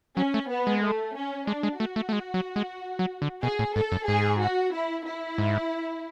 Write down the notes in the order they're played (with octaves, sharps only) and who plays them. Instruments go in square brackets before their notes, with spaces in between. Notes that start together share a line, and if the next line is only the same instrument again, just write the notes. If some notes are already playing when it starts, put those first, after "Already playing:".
[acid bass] F#3 [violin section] C#4
[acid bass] A3
[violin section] B3
[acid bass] G#3
[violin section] A3
C#4
[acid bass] G#3 [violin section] D4
[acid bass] G#3
[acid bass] A3 [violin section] F#4
[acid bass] A3
A3
G#3
F#3
G#3
F#3
D3
[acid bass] B2 [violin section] G#4
[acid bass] A2
[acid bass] G#2 [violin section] A4
[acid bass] F#2
[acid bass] G#2 [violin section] G#4
[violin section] F#4
E4
E4
[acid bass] G#2